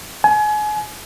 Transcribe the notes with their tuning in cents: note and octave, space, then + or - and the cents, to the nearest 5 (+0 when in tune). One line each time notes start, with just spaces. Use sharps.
G#5 +30